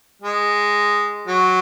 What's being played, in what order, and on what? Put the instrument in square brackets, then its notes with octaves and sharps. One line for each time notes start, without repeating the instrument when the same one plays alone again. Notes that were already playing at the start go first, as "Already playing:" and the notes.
[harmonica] G#3
F#3